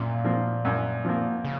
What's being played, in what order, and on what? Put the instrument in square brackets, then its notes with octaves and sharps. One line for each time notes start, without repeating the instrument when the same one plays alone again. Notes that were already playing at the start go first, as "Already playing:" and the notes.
Already playing: [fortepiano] F#2 [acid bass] A#2
[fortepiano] F3 A#3
F#2
F3 A#3
[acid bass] C#3